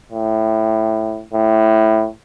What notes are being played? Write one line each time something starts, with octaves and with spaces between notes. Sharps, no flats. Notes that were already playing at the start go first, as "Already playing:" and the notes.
A2
A2